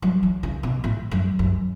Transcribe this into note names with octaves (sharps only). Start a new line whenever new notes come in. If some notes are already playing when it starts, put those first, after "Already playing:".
F#3
E3
C#3
B2
A2
F#2
F#2